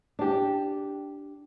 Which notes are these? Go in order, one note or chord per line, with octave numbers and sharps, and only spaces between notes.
D4 G4